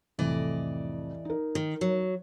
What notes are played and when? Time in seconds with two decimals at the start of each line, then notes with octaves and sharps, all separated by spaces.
0.19 C2 F2 A2 E3 D5 D#5
1.25 D#4 A#4
1.55 D#3
1.81 F#3